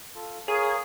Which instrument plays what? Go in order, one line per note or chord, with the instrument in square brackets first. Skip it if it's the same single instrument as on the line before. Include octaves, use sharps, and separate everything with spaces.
[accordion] F4 A4
[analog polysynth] G#4 [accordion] A#4 C#5 F5